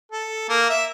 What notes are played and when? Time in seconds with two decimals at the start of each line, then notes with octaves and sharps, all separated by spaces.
0.12 A4
0.49 A#3
0.69 E5